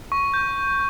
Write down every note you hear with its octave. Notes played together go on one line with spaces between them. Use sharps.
C#6
G6